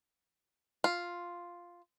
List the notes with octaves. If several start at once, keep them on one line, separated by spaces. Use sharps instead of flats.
F4